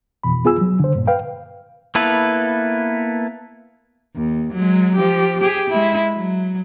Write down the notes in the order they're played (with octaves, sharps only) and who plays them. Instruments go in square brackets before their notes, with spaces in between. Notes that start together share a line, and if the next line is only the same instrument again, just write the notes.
[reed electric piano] F2 B2 E3 B5
B3 F4 G#4 G#5 E6
F#3
D3 C5
G2 A#2
B4 F5 G5
[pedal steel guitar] A#3 B3 E4 A4 B4
[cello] D#2
F#3 G#3
F3 G4
G4 G#4
G#3 E4
F#3